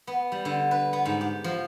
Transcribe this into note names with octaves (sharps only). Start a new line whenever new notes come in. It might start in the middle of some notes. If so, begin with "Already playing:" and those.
B3
G3
D3
B4
B3
G#2
G4
F3